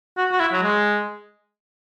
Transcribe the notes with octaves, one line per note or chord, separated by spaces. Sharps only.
F#4
F#4
E4
F#3
G#3